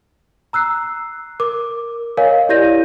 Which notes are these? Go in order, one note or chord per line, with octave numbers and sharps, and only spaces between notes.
A#5 E6 F#6 C7
A#4 D6
A#4 C#5 D#5 F5 G#5
E4 G4 D5 G6 A#6 D#7